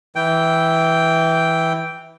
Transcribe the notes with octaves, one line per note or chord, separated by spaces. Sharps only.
E3 G5